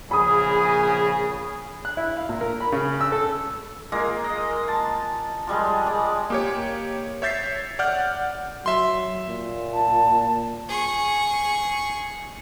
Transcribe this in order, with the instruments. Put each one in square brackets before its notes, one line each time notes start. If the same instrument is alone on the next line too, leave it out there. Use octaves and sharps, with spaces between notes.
[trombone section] A#1 C#3 G#4 [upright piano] B5 D#6
[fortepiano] F#6
E4
F5
A#2
A#4
B5
C#3
E6
A4
[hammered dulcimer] G#3 A#3 F4
D#5
A5
F3 G3 G#3
G#4 D5
[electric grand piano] A#3 G4 C#5
C#5 E5 G6 A6 B6 C7
D5 F#5 F6 G6
[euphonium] F#3 [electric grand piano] E5 C6
[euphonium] A#2
[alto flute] A5
[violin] G#4 C#6